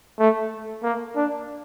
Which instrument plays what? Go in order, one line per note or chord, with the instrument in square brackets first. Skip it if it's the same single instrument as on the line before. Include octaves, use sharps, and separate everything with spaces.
[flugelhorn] A3
A#3
D4